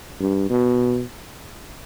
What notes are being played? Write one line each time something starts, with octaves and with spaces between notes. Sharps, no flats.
G2
B2